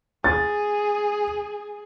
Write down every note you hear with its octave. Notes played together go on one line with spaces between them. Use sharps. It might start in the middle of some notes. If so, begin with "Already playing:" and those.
G#4 A6